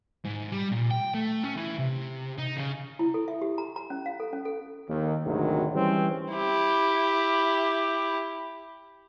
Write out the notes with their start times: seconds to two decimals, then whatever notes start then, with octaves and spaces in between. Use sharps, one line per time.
0.24 G#2
0.52 G3
0.72 A#2
0.91 G5
1.15 A3
1.44 C#4
1.56 E3
1.78 C3
2.38 D#4
2.57 C#3
2.99 E4
3.14 A4
3.28 E5
3.42 G4
3.58 A#5
3.76 A#5
3.90 C#4
4.06 F5
4.20 A4
4.33 C#4
4.45 A4
4.88 D#2
5.25 G#1 D2 C3 D#3 F#3
5.74 E3 G3 C4 C#4
6.34 E4 G4